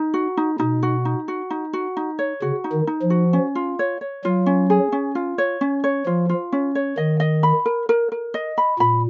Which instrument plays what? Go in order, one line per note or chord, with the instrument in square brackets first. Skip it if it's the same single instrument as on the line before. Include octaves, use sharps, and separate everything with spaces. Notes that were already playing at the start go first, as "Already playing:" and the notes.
Already playing: [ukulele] D#4
F#4
D#4
[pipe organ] B2 [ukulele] D#4
[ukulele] F#4
D#4
F#4
D#4
F#4
D#4
C#5
[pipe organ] C#3 [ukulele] F#4
[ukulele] D#4
[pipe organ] D#3
[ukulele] D#4
[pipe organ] F3
[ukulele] F#4
C#4
F4
C#5
C#5
[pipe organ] F#3 [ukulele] F4
[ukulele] C#4
G#4
C#4
F4
C#5
C#4
C#5
[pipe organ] F3 [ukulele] F4
[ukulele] F4
C#4
C#5
[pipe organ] D#3 [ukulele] D#5
[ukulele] D#5
B5
A#4
A#4
A#4
D#5
B5
[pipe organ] A#2 [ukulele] B5